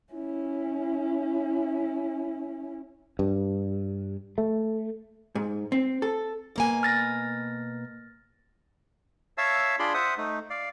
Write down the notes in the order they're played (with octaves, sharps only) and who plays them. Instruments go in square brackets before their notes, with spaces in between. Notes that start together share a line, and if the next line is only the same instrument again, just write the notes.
[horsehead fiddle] C#4 E4
[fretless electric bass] G2
A3
[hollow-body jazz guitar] G#2
C4
A4
[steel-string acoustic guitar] B2 A#3 G#5
[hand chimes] F6 A6 A#6
[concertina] C#5 E5 F5 A5 E6
D4 F4 G#4 D5 B5 C6
C5 E5 F#5 D#6
A3 D#4
D5 F5